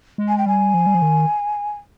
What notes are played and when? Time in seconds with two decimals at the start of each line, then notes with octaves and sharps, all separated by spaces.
0.18 G#3
0.28 G#5
0.38 G5
0.46 G3 G#5
0.74 F3
0.86 G3
0.95 F3
1.02 D#3